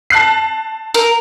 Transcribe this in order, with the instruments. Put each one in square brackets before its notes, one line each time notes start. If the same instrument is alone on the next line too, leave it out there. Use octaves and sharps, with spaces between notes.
[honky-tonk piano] A5 F#6 C7
[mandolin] A#4